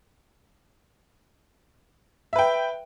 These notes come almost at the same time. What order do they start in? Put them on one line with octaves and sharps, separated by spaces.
E5 B4 G5